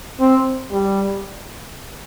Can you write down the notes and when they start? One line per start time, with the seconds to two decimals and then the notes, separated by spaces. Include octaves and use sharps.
0.20 C4
0.72 G3